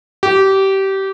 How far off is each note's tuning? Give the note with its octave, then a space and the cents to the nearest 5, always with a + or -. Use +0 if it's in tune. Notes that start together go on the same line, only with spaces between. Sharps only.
G4 -20